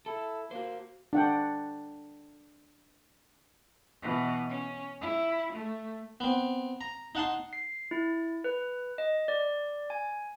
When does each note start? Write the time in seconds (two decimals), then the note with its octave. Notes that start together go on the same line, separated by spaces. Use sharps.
0.06 E4 A4
0.51 A#3 F#4 C5
1.13 D4 F#5 G5
4.02 B2 E3
4.49 C#4
5.01 E4
5.53 A3
6.20 B3 C4
6.81 A#5
7.15 D#4 F#5 A5 C6
7.53 C7
7.91 E4
8.44 B4
8.98 D#5
9.28 D5
9.90 G#5